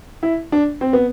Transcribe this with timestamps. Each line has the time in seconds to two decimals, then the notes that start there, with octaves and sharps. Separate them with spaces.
0.23 E4
0.52 D4
0.81 C4
0.93 B3